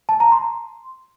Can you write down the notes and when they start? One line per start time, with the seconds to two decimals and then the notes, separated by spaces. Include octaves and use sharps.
0.09 A5
0.20 A#5
0.32 C6